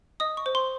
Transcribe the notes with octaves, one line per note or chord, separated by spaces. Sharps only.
D#5 D#6
C#6
C5
C6